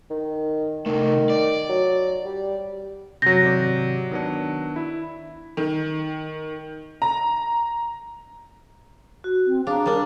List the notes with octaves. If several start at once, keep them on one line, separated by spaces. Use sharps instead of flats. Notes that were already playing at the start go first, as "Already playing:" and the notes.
D#3
C2 D#3 A3
D5
F#3
G3
F#2 C3 F#3 G6 A#6
G#1 C3 D5
D#3 B3 D4
E4
D#3
A#5
F#4
C4
D4 G#4 F5 A#5
G3 D4 A#4